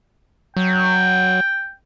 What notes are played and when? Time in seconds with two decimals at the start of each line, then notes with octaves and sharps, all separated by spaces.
0.57 F#3 G5